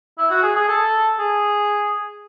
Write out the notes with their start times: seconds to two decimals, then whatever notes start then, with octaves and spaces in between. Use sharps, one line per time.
0.18 E4
0.30 F#4
0.43 G#4
0.56 G#4
0.68 A4
1.19 G#4